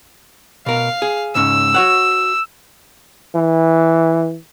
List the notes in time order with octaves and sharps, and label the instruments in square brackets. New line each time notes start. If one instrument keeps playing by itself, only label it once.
[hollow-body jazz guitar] B2 A#4 [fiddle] F5
[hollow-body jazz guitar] G#4
[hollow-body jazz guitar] C#2 G#2 C#4 [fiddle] E6
[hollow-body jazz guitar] F#4 C#5 F#5
[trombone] E3